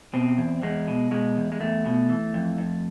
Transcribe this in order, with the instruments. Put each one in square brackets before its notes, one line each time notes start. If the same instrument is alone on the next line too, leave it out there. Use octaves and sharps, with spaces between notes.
[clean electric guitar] B2 C4
E2
E2 G#3
B2
B2 G#3
E2
G#3
E2 A3
B2
E3
F2
F2